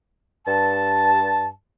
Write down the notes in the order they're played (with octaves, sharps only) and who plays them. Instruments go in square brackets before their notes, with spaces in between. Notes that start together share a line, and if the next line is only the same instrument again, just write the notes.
[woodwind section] G2 A5